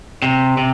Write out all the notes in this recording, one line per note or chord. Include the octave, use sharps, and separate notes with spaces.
C3
C3